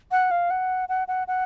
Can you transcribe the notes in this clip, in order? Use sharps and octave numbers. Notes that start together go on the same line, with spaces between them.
F#5
F5
F#5
F#5
F#5
F#5